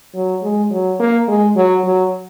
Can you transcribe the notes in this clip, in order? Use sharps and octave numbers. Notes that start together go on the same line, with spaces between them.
F#3
G#3
F#3
A#3
G#3
F#3
F#3